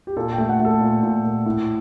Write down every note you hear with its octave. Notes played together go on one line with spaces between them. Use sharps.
G4
A#2 A4
G5
A3
F#5
A3 A4
A#2
A#2
A#2
A2